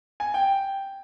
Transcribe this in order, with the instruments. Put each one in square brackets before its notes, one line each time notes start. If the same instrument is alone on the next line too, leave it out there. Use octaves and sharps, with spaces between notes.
[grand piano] G#5
G5